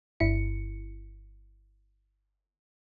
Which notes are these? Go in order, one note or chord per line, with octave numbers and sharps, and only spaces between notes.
G1 G2 E4 C#7